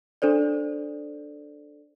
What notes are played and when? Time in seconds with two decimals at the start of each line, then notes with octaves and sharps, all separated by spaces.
0.22 D4 A4 C5 D5